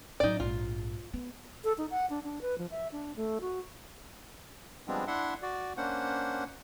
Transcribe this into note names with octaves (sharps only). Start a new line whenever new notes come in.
A2 F#3 D#4 D5
A#1 G#2 F4
B3
A4
D#4
F#5
D4
D4
B4
F3
E5
D4
A3
F#4
F3 G3 G#3 B3 C4 D4
D4 E4 E5 F#5 C6
F#4 D5
A#3 C#4 D4 C5 F#5